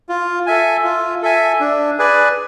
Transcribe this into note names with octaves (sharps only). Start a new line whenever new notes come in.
F4
A4 E5 G#5
F4
A4 E5 G#5
D4
G#4 B4 D5 G#5